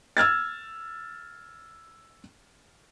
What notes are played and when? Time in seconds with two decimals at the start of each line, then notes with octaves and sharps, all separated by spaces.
0.17 E6 F6 G#6 A6